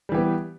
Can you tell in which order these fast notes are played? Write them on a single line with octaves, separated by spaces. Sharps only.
G3 E3 G4 B3